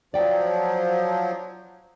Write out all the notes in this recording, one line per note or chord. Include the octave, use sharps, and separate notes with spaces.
F3 F#3 D5 G5